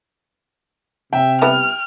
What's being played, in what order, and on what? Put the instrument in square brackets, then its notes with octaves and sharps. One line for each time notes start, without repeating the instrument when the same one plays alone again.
[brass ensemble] C3 [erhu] E5 [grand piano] G5
[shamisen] G3 B3 E4 [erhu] F6